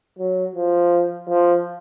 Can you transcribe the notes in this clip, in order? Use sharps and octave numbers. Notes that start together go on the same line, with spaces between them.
F#3
F3
F3